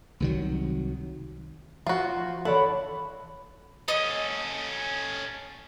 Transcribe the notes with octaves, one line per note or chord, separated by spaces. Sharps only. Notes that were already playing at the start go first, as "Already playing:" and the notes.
C2 D#3 F#3
F3 F4 F#4
E3 A4 C#5 D5 F#5 A5 B5
C#4 A4 D#5